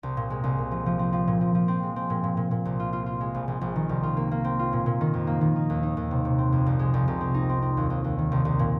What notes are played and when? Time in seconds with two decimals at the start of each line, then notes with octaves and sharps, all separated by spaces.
0.03 C2
0.17 A#2
0.30 G#3
0.44 C2
0.58 A#2
0.71 F3
0.86 F3
0.99 C4
1.13 F3
1.28 A#2
1.41 F3
1.55 F3
1.68 C4
1.83 G#3
1.96 C4
2.10 A#2
2.24 A#2
2.37 A#2
2.51 A#2
2.65 C2
2.80 F4
2.93 F4
3.06 F4
3.21 G#3
3.34 A#1
3.48 A#1
3.61 A#1
3.76 D#3
3.89 C2
4.03 F4
4.17 A#3
4.31 A#3
4.44 C4
4.59 F4
4.73 A#2
4.86 A#2
5.01 D#3
5.14 F2
5.27 A#3
5.41 D#3
5.56 D#4
5.70 D#2
5.83 D#4
5.97 D#2
6.11 C3
6.25 C3
6.38 C4
6.52 F2
6.66 C2
6.79 G#3
6.94 C2
7.08 C2
7.21 C4
7.34 D#4
7.49 C4
7.62 C4
7.77 D#2
7.90 D#2
8.04 D#2
8.19 D#3
8.32 C2
8.45 C2
8.59 A#2